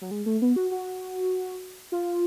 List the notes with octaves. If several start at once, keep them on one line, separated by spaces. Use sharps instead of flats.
F#3
G#3
A3
B3
F#4
F#4
F4